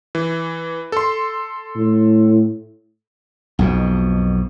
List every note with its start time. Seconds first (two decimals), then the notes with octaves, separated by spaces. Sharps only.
0.15 E3
0.92 A4 C6
1.76 A2
3.59 B1 F2 B2